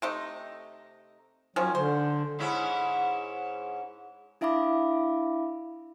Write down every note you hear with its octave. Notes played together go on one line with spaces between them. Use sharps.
C3 A3 D#4
D#3 F3 F#3 C#4
D3 C5
G#2 C#4 E4
D4 E4 E5 F5 B5 D6